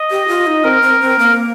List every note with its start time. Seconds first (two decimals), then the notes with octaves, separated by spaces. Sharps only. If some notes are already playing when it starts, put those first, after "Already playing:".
Already playing: D#5
0.11 G4
0.28 F4
0.47 D#4
0.64 C4 A#4
0.82 C4
1.01 C4
1.19 A#3